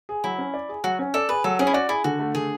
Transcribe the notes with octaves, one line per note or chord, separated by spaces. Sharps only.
G#4
F#3 E4
C#4
D5
G#4
F#3 F#4
C#4
A4 D5
G#4 B4
F#3 A4
C#4 G#4
E4
F#4 D5
E4 G#4
D3 F#4
A3
D3 G#4